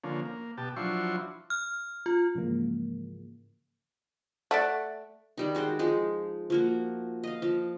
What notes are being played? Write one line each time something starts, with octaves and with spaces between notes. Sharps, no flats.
D3 F3 A#3 C#4
A#3
B2 G4 A5
F3 F#3 D4 E4 C6 C#6
F6
F4
G#2 C#3 E3 F3 G#3 A#3
A3 D5 E5 F#5
D#3 G3 D#4
G#3 F#4 C5 G5
F3 G#3 D#4
F3 A#3 F#4
D#5 F5
F3